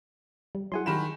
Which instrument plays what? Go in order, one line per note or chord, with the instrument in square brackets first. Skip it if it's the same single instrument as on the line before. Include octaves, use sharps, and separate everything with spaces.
[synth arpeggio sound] G3
[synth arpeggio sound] F#3 E4 G#4 [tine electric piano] F#5 G#5 C6
[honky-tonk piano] D#3 B5 E7 [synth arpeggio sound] F4 G4